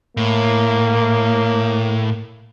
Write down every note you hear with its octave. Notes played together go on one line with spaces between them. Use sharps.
A2 A#3